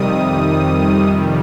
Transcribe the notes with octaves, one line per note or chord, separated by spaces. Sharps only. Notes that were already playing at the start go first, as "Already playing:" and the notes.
Already playing: F2 C3 D#3 G3 D#6